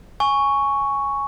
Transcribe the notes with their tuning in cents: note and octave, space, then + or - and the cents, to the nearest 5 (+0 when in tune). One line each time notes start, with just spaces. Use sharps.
G#5 +0 C#6 +0